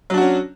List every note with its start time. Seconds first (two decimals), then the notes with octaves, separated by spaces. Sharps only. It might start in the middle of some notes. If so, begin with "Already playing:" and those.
0.10 F#3
0.14 D4
0.18 F#4
0.21 C#4